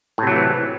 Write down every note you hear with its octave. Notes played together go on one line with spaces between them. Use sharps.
A2 C3 E3 F#3 A3